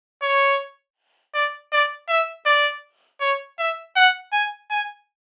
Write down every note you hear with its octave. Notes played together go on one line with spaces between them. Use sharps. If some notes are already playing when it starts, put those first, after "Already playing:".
C#5
D5
D5
E5
D5
C#5
E5
F#5
G#5
G#5